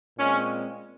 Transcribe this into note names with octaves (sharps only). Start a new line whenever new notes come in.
A#2 G#3 C4 C#4